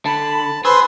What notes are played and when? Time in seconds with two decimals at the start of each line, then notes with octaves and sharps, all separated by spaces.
0.06 D3 A5 B5
0.65 G#4 B4 C5 C6 E6